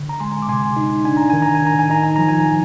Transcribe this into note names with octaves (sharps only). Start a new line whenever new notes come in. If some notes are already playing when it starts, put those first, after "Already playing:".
Already playing: D3
A#5
G#3 G#5 C6
D6
C3 G#5 C6
D#4
D4 G#5
A#5
D#3 G#5
A#5
G#5
D#3 A#5
G#5
D#4 A#5
G#5
F3 A#5
G#5
A#5
F3